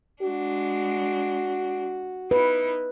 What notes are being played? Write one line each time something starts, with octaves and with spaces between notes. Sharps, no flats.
G#3 D4 F#4
D#4 E4 B4